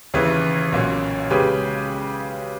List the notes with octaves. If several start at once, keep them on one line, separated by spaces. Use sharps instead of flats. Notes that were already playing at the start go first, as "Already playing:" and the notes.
D#2 C#3 E3
B1 A#2 A#3 C#4
C#3 G#3 C#4 G4 B4